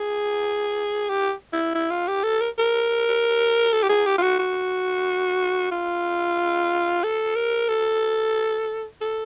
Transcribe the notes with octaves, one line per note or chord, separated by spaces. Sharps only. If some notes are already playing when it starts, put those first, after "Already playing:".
Already playing: G#4
G4
E4
E4
F4
G4
A4
A#4
A#4
A4
G4
G#4
G4
F4
F#4
F#4
F4
A4
A#4
A4
A4